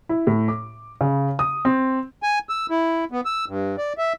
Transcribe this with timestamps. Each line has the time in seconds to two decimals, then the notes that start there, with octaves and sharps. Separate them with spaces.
0.09 E4
0.27 A2
0.48 D6
1.01 C#3
1.39 D#6
1.65 C4
2.23 G#5
2.49 E6
2.70 E4
3.11 B3
3.25 E6
3.48 G2
3.78 D5
3.98 E5